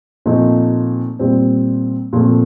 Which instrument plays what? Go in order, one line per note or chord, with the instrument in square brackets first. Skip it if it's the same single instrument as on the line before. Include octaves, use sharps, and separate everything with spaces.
[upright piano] A#2 F3 A3 C4 D#4
A#2 G3 C4
A#2 F3 A3 C4